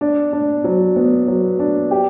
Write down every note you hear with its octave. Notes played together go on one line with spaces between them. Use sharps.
D4
D4
F#3
B3
F#3
D4
G4